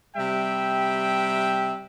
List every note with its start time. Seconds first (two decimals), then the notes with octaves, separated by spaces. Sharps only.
0.16 C3 G3 E5 G5